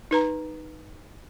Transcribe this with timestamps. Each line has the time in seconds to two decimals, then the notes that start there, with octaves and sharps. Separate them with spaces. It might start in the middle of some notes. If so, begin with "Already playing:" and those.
0.11 D#4 B4 A#5